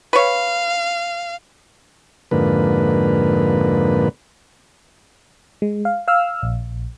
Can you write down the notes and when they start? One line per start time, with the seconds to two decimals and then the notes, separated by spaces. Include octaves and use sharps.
0.13 B4 C#5 F5
2.31 F2 G#2 D3 A#3 B4
5.62 G#3
5.85 F5
6.08 F5 E6 F6
6.42 A#1